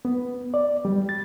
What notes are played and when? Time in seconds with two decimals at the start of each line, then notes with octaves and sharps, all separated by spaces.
0.05 B3
0.54 D5
0.85 G3
1.09 A6